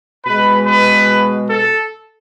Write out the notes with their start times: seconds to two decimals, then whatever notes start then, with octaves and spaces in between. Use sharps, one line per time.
0.25 B2 G#3 B4
0.66 B4
1.50 A4